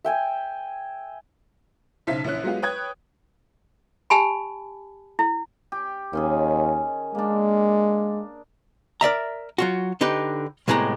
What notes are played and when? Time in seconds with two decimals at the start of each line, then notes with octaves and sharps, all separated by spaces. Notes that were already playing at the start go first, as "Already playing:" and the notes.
0.05 E5 G5 G#5
2.07 B1 C#3 D#4 C5 E5 B6
2.24 A#1 E3 C#4 F#6
2.44 F#3 G#3 B3 F4 G4
2.62 B4 C#5 G5 D#6 F#6 G#6
4.10 G4 G#5 A5 B5
5.19 E4
5.72 G4
6.13 D#2 D#3 C#4 G#4
7.15 G#3 A#3 D4
9.01 A#4 D5 E5 A#5
9.58 F#3 F4 F#4
10.01 D3 D#4 G4 B4
10.68 C2 A2 G#3 B3 G4 A#5